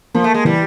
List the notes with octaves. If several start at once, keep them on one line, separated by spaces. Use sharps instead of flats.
F3 A#3
A3
G#3
E3 G3